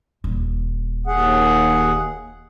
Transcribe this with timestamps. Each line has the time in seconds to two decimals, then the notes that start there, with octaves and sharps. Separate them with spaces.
0.24 D#1
1.07 D#2 G#4 F#5